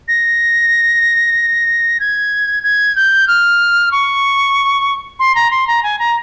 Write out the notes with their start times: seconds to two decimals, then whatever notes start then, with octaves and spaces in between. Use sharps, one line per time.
0.08 A#6
2.00 G#6
2.63 G#6
2.96 G6
3.28 F6
3.92 C#6
5.19 C6
5.35 A#5
5.51 C6
5.67 A#5
5.83 G#5
5.99 A#5